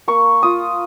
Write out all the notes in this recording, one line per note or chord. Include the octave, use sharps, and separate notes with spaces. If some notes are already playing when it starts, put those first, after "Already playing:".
A#3 C#6
F4 D#6